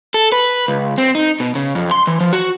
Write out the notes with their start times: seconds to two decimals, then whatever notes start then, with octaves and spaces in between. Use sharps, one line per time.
0.14 A4
0.32 B4
0.68 C#2
0.98 C4
1.15 D#4
1.40 B2
1.55 C#3
1.75 F2
1.91 C6
2.07 E3
2.20 F3
2.33 F#4